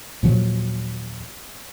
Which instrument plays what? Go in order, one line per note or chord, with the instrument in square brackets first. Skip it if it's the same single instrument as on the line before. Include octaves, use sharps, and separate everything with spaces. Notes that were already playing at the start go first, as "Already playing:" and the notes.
[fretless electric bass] D#2 A#2 F3 F#3